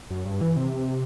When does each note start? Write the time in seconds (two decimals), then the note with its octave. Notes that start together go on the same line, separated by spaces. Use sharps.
0.10 F#2
0.25 G2
0.41 E3
0.56 C3